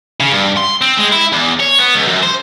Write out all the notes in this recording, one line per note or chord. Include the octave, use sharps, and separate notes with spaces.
C#3
G2
C6
C4
G#3
E4
E2
C#5
B3
C#2
F#2
C5